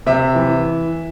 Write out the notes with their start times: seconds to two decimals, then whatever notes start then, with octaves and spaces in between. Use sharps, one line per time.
0.06 C3 E5
0.35 E3